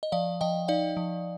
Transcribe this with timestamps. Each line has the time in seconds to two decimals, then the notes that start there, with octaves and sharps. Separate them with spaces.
0.03 D#5
0.12 F3 D5 F5
0.41 F3 D#5 G5
0.68 D#4 D5 F5
0.97 F3